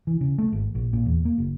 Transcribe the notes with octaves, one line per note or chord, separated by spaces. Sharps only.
E3
C#3
A3
G#1
A#1
A#2
E2
A#3
F#1